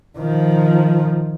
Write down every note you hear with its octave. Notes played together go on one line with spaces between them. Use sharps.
D#3 F3